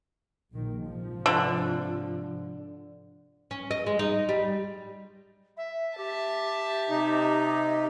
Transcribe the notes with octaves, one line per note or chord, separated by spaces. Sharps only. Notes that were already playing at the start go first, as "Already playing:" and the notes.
A#1 D#3
G#2 C3 F3
D3
C#4
D#5
G#3
D#4
G3
E5
G4 E5 A5
C3 D#4